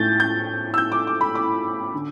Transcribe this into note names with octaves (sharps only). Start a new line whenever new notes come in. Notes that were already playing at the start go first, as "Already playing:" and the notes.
Already playing: A2 A3 G6 A6
G6
E6
G6
D6
D6
B5
D6
D3